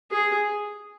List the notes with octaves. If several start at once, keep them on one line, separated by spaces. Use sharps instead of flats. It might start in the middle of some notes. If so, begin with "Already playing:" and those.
G#4